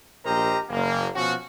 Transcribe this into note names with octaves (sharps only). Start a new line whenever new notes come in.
A#1 G4 A#4 C5 D#5 A#5
F#1 A#3
B2 F3 C#4 F#4